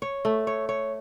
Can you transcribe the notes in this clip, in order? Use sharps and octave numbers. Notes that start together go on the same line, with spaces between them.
C#5
A3
C#5
C#5